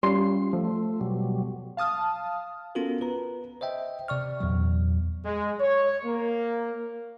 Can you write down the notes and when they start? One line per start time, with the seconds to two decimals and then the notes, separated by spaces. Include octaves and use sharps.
0.03 G3 C#4 F4 C6
0.53 F3 A3
1.01 B2 F#3 G3
1.77 F5 A5 D#6 F6
2.75 B3 C#4 F4 F#4 A4 A#4
3.01 B4 A#5
3.61 C5 D#5 E5 G5
4.08 C3 D5 C#6 F6
4.40 E2 A#2 F#3
5.25 G#3
5.60 C#5
6.05 A#3